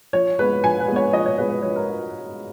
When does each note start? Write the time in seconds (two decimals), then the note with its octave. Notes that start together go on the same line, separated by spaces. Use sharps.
0.13 F3 C#5
0.39 G#3 B3 B4
0.64 F3 G#5
0.80 B4
0.88 G#3 B3
0.96 C#5
1.13 F3 D#5
1.26 C#5
1.38 G#3 B3 B4
1.50 B4
1.62 F3 C#5
1.76 A#4